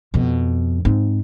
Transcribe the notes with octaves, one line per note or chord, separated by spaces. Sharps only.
F2 B2
G#2 C4